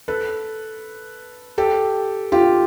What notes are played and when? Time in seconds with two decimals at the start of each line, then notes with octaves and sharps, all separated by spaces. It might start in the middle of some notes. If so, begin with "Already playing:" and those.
0.08 A4 B4
1.58 G4 A4
2.32 F4 G4